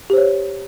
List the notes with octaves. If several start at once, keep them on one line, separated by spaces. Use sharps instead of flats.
G4 C5 C#5